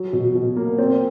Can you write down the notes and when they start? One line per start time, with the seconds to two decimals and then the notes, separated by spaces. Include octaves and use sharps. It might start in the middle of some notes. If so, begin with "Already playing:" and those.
Already playing: F#3
0.13 B2
0.35 B2
0.56 A#3
0.78 C4